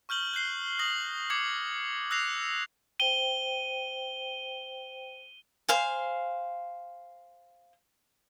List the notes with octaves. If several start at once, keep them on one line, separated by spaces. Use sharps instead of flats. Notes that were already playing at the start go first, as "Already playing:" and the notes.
C#6 F6 G6 F#7 G7
F#6 G6 C7 G7
D#6 A#6 F#7
D6 G#6 C#7 F#7
E6 F#6 A#6 C7 F7
C5 G5 D#7 G7
C5 F5 G#5